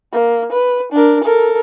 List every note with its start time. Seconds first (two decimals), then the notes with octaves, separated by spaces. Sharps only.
0.12 A#3
0.52 B4
0.92 D4 A#4
1.24 A4 A#4